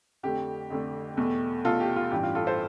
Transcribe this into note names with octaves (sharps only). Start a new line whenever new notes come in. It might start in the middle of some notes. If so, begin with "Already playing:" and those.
F2 D3 A3 G4
F2 D3 A3
E2 B2 A3
E2 B2 A3 F4 A4
G4
F4
A1 G2 E3 G3 G4
F4
F4 A4
A4 C5